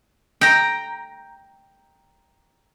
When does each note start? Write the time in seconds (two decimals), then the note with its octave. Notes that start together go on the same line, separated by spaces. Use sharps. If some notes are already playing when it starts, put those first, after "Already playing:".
0.41 G5 A#5